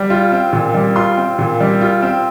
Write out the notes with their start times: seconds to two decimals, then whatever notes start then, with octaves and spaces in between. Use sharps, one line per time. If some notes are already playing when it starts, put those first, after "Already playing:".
Already playing: G3
0.10 F4
0.32 C4
0.53 A#2
0.74 G3
0.96 F4 C6
1.17 C4
1.38 A#2
1.60 G3
1.81 F4
2.02 C4